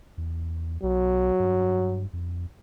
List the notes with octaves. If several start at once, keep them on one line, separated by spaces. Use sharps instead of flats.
E2
B1 F#3
G2
F2